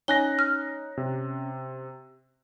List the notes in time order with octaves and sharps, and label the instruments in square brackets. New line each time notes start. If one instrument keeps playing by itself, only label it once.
[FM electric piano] C#4 [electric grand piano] D#4 F#6 A#6 [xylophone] G#5 G7
[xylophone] F6
[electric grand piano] C3